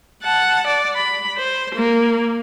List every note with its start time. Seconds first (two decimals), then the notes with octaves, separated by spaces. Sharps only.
0.23 F#5 A5
0.67 D5
0.96 B5
1.37 C5
1.75 A#3